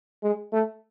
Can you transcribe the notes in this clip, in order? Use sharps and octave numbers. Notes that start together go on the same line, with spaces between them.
G#3
A3